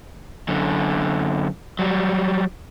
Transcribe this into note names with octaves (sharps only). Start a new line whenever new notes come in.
F#2 D3
F#3 G3